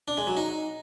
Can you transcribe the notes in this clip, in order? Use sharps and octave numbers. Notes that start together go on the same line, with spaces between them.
D4
G#3
F#3
D#4